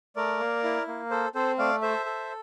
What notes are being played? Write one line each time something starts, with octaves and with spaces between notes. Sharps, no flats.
A3 A#4 D5
A#3
E4
A#3
A4 C5
C4 A4 C5
A3 D5 F5
A4 C5 E5
A4